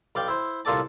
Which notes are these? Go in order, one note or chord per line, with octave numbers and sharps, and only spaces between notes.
B1 D5 F5 G5
E4 C5
C2 A#2 F4 A4 D5 A5